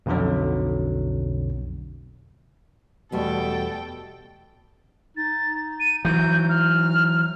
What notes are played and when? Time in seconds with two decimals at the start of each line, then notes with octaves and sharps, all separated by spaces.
0.06 B1 F2 B2 D3 F#3
3.12 E2 B2 G3 A3 A4 G5
5.17 D#4 A6
5.80 D#7
6.05 E3 F#3 G6
6.49 F6